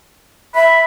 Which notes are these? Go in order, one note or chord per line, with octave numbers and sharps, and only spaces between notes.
E5 B5